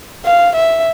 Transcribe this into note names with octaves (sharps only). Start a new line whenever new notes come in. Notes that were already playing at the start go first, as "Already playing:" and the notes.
F5
E5